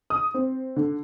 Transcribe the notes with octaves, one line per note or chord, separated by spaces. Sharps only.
D#6
C4
D3